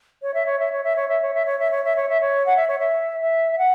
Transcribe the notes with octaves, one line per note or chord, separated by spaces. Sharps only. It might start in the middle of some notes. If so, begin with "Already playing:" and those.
C#5
E5
C#5
E5
C#5
E5
C#5
E5
C#5
E5
C#5
E5
C#5
E5
C#5
E5
C#5
F#5
E5
C#5
E5
E5
E5
F#5